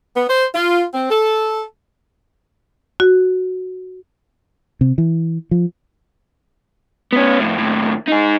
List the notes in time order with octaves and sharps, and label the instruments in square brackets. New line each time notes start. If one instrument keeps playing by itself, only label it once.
[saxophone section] B3
C5
F4
C4
A4
[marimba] F#4
[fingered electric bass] C3
E3
F3
[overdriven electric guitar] B3 C#4
F2 A2
D#2 A2
D#4 G#4